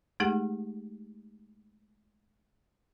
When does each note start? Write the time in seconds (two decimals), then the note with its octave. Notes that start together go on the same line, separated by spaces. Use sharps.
0.20 G#3 A3 D#4 G4 G#4 F#5